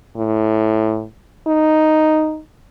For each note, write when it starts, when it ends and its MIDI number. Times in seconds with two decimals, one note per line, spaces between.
0.17 1.04 45
1.47 2.39 63